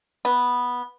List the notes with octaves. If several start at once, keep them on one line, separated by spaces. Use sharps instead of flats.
B3